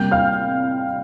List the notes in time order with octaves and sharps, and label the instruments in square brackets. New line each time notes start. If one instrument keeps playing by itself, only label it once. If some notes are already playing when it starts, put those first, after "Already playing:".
Already playing: [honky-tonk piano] C3 G3 A#3 G5 G6
F5 F6